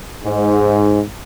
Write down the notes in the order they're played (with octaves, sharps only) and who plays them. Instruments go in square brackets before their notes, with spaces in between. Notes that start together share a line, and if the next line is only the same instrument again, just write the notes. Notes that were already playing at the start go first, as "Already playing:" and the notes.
[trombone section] G#2